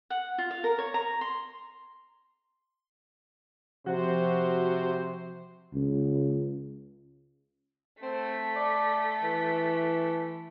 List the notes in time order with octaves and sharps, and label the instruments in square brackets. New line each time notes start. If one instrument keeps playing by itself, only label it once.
[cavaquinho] F#5
F4
F5
A#4
C#5
A#5
C6
[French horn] C3 [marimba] F3 [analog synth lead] F#4 [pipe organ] C5
[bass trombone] C#2
[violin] A3 B6 [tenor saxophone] C4
[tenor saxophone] D5
E3